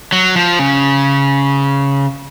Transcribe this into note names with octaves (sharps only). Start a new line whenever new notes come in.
F#3
F3
C#3